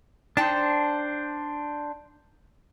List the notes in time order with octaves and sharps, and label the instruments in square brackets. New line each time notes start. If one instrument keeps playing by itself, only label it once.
[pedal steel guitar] D4 C5 [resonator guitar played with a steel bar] D#4 G5 A5